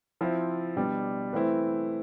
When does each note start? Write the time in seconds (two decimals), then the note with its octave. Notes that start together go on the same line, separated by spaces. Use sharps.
0.21 F3 C4 E4
0.76 B2 G3 D4
1.33 E3 A3 C4 E4